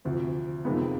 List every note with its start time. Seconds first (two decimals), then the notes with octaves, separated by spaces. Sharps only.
0.05 D2 C3 F3
0.65 F2 C3 D#3 G#3 B3